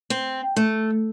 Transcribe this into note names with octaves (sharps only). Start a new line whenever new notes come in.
C4
A3